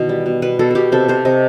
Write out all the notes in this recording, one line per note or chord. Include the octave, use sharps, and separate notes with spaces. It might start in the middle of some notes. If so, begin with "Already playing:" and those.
Already playing: B2 D#3 E3 B3
G3
B2
B2 B4
B2 A4
B2 G4 A4
C3 A4
C3 C5
C3 D#5